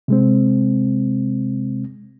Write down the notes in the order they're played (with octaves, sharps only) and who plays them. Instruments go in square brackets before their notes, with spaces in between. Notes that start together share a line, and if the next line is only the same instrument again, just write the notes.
[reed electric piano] C3 G#3 C4